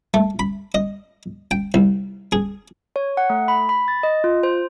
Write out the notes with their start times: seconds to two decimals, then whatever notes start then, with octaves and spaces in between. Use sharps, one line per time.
0.14 A3
0.39 B5
0.75 D#5
1.51 G5
1.74 C2
2.32 G#4
2.96 C#5
3.17 F#5
3.30 A3
3.48 B5
3.69 B5
3.88 A6
4.03 D#5
4.24 F4
4.43 C5